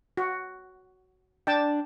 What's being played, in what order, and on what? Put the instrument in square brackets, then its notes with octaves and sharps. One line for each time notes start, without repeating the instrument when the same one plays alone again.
[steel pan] F#4
[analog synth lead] D4 [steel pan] G5 A5